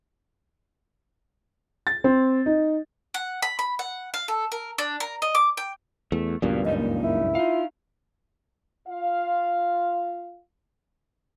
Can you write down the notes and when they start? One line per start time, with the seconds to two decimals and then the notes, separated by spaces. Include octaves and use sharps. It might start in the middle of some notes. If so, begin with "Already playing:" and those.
1.87 A6
2.04 C4
2.46 D#4
3.14 F#5
3.42 B5
3.59 B5
3.79 F#5
4.14 F5
4.28 A4
4.52 A#4
4.78 D4
5.00 A#4
5.22 D#5
5.35 D6
5.57 G5
6.12 E2 A3
6.42 C#2 G2 A#2 F#3 A#3 B3
6.65 F#2 G3 D#4 D#5
6.77 A#3
7.03 E4
7.35 D#4 F4 F5
8.88 F4 F5